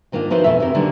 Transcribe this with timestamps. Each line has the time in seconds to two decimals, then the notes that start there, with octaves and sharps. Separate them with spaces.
0.12 G#2 D#3 A#3 D4 F4
0.30 F3 D#4 E4 F#4 B4 C5
0.44 F2 B2 E3 A3 E5
0.60 C3 C4 A#4
0.75 D3 D#3 F#3 G3 A#3